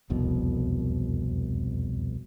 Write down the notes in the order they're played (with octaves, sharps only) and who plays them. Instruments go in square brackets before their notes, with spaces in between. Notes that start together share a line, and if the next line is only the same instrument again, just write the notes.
[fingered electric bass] E1 C2 F2 B2